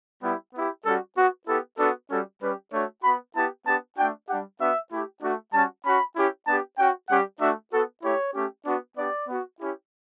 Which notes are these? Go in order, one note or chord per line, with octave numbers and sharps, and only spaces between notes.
G3 B3 E4 G4
B3 E4 G4
G3 C#4 F#4 A4
B3 F#4
B3 E4 G4 A4
B3 D4 F#4 A4
G3 C#4 F#4 A4
G3 C#4 G4 B4
A3 D4 F#4 C#5
B3 F#4 B5
B3 E4 G4 A5
B3 D4 G4 A5
A3 D4 F#4 G5
G3 D4 G4 F#5
B3 D4 F#4 E5
A3 E4 G4
A3 D4 F#4
G3 C#4 F#4 A5
C#4 F#4 B5
C#4 E4 G4
B3 D4 G4 A5
C#4 F#4 G5
G3 C#4 G4 F#5
A3 D4 F#4 E5
B3 F#4 A4
A3 E4 G4 C#5
A3 C#4 G4
B3 D4 F#4
B3 D4 G4 D5
B3 F#4
C#4 E4 G4